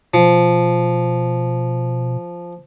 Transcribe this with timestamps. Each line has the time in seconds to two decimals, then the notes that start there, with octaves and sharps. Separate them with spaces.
0.14 B2 F3